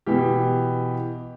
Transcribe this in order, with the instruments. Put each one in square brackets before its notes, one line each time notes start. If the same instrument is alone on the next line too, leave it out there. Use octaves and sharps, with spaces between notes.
[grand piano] B2 E3 G4